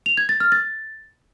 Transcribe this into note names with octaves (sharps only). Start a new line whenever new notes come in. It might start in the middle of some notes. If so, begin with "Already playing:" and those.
F7
G#6
A6
F6
A6